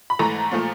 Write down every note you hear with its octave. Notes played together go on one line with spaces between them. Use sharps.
B5
G#2 E3 A3 A#5
A#2 F3 A3